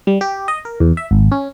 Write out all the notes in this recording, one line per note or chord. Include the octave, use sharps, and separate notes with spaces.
G3
G4
D#5
A#4
E2
E5
G#1
C#4